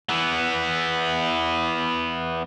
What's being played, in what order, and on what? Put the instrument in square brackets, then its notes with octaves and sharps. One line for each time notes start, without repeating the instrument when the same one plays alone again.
[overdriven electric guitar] E3 B3